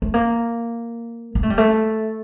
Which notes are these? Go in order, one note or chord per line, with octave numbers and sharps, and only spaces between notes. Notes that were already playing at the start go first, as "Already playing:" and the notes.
A3
A#3
A#3
A3
G3
A3